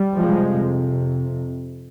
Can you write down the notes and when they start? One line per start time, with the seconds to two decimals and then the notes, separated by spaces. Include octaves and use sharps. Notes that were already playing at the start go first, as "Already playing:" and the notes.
Already playing: G3
0.17 F2 C3 F3 G#3